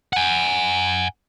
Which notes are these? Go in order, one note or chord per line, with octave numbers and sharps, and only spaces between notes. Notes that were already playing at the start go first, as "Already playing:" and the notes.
F#5 G#5